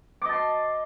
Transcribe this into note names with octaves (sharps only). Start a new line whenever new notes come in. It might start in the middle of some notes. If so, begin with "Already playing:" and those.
D#5 A5 C6 D6